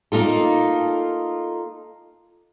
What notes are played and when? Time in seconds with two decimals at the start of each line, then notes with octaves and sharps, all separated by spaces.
0.12 A#3 D#4 F4 A4